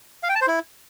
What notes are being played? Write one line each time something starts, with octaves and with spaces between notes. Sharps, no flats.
F5
G5
A5
C5
E4